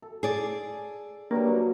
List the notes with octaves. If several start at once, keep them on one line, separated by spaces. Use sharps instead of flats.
A4
G#4 D5
G2 F#3 A#3 C#6